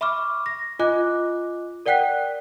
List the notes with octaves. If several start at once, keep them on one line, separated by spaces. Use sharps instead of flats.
E5 B5 C#6 D6 F6
A#6
F4 D#5 G#5 D6 F#6
A#4 D5 F#5 G5 F#6 B6